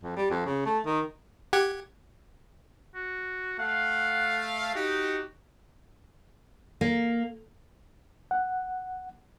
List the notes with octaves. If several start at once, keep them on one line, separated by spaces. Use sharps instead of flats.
F2
G3
F2
C#3
A3
D#3
G4 F#5 G#6
F#4
A3 F5 F#5
D#4 F#4 G4
A#3
F#5